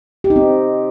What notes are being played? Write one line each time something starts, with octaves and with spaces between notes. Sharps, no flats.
G4
D#4
C4